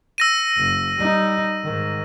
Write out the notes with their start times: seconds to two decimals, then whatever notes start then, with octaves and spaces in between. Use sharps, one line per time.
0.18 E6 A#6 D#7
0.57 F#1
0.99 G3 D#4
1.64 G#2 D#3